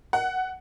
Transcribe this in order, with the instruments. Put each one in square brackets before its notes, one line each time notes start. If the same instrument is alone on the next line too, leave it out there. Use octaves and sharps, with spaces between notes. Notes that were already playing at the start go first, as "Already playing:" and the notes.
[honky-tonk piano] F#5